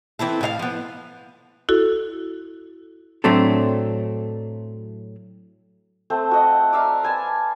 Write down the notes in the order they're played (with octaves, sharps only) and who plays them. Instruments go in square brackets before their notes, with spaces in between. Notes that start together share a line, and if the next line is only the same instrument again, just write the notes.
[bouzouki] E3 C4 E4 A4
A2 G#4 F5
F3 B3
[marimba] E4 F#4 A4
[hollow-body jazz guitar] A2 F#3 A3 C4 D4 A4
[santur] A3 C4 C5
F#4 D#5
D5 E5 F5 A#5
B4 G#5 A5